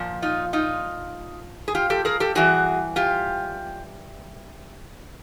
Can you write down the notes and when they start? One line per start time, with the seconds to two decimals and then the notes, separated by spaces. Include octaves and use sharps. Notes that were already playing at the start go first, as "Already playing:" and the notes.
Already playing: A#2 F3
0.22 D#4 F4
0.53 D#4 F4
1.68 G#4
1.75 F4 G4
1.90 G4 A4
2.05 G#4 A#4
2.20 G4 A4
2.35 G2 E3 F#4 G#4
2.96 F4 G4